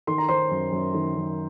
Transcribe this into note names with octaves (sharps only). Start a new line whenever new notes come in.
D#3 C6
A#5
D#3 C5 C6
F#2
F#2
D#3
F#2